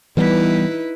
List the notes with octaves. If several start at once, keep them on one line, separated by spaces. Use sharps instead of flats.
E3 G3 B3 D#4 E4 B4